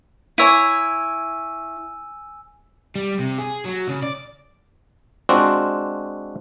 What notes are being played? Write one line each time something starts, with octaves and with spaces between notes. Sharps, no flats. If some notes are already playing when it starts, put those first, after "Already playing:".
E4 C#5 G#5 E6 D#7
G3
C3
G#4
F#3
C#3
D5
G#3 C4 D4 F4 F#4